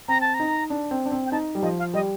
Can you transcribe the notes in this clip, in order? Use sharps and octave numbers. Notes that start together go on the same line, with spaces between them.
C4 A#5
A5
A#5
D#4
D4
C4
D4
C4
G5
D#4 A5
G3
F3 D#5
F5
G3 D#5